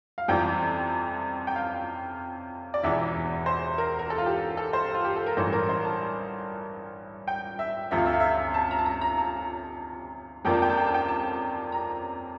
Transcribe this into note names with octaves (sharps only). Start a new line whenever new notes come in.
F5
F2 C3 E3 G3 G5
G5
F5
D5
E1 E2 E3 E5
C5
A#4
A#4
A4
F4
G4
A4
C5
F4
G4
A4
A#4
A1 G2 E3 C5
A#4
C5
A5
G5
E5
D2 C3 F3 E5
F5
E5
F5
E5
A5
A#5
A5
A#5
A#5
A5
F2 C3 F3 A#3 D4 G5
A5
G5
A5
G5
A5
G5
A5
A#5